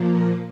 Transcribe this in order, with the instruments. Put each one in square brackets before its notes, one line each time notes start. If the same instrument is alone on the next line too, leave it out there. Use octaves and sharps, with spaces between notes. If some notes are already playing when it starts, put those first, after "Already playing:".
Already playing: [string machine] A#2 F3 A#3
A#4